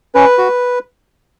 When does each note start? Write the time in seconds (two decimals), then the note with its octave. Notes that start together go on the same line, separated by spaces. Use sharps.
0.15 C#4 B4
0.38 F#4